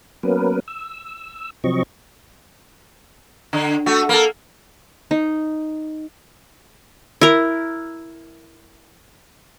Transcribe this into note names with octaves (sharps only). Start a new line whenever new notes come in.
F#3 A#3 B3 C#4 A#4 B4
E6
C3 F3 F#3 C4 D#5 C#6
D3
A3 F#4
A#3 A4
D#4
E4 A#4